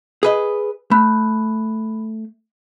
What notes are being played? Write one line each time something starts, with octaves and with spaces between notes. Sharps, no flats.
G#4 B4 D#5
A3 B5 F#6